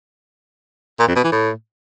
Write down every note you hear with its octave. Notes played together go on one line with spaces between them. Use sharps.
A#2
F2
B2
E3
A2